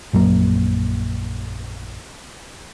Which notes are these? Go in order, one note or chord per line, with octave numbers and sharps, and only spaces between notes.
A#1 F#2 F#3 A#3